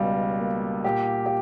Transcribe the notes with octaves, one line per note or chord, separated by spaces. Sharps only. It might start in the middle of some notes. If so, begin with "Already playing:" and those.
Already playing: C#2 B2 G3
A#3
A#2 G4
G4